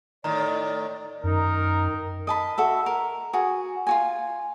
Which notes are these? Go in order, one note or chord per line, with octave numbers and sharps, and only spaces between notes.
A2 D#3 D5 A#5
F#2 D#3 D#4 A#4
D#5 A5 B5
F#4 A4 E5
A#4
F#4 G#4
F4 F#4 G#5